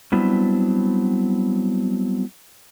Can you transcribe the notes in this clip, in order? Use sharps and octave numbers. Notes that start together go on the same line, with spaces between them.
F#3 G3 B3 C4 D4 E4